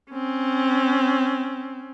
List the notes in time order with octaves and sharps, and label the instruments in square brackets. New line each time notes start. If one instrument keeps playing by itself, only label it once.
[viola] C4 C#4